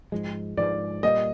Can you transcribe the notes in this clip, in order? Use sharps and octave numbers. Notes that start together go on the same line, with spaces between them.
G#2 F3 G#3
G#2 F3 G#3 D5
A#2 G3 A#3 D#5